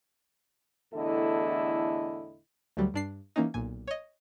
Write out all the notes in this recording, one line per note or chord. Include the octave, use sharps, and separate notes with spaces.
E2 A2 D3 E4 A4 D#5
D2 D3 F#3 G3
G2 D4 C7
E3 A#3 C#4 D#4
B1 A#2 G#5
C#5 D#5